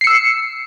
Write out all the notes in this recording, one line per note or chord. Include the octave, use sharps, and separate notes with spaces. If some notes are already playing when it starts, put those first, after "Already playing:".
E6 C7 C#7